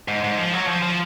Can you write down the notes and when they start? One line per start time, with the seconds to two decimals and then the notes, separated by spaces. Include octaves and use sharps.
0.08 G#2
0.24 G#2
0.38 F3
0.53 F#3
0.68 F3
0.83 F3